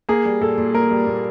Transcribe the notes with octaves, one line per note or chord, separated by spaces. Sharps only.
A#3 G#4
G3
A#2 A4
A#2
A#3 A#4
G3
A#2